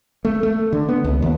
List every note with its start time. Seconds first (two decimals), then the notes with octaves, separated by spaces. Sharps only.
0.25 A3
0.43 A3
0.73 D3
0.89 B3
1.05 C#2
1.22 D#2